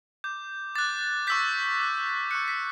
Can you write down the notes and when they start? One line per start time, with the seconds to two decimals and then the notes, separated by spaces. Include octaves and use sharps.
0.24 D6 G6
0.75 D6 F#6 A6
1.27 C#6 E6 G6 B6
1.79 D6 F#6
2.31 C#6 F#6 C#7
2.48 B6